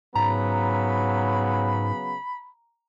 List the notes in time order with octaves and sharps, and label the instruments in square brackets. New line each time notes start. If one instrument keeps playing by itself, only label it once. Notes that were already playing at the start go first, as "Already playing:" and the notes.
[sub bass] G#2 [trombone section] C#3 F#3 B3 [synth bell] A#5 [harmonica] B5